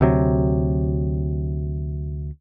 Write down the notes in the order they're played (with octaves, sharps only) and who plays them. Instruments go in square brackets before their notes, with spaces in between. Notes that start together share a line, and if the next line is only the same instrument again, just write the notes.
[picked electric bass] D2 C3 F#3